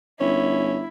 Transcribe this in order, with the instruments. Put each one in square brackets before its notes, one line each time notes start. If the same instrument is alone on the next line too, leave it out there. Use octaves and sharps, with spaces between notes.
[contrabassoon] G1 [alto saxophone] C#4 [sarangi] E4